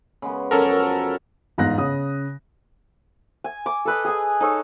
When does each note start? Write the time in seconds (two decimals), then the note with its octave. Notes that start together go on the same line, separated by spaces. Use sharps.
0.22 C#3 G#3 B3
0.51 F#2 F3 C#4 F#4 A4 A#4
1.58 G1 E2 G#2 F5 F#6 A#6
1.78 C#3 D#6
3.44 G#5
3.66 D6
3.85 A4 B4 D#5
4.05 G#4 G#5
4.41 D#4 A4 C#5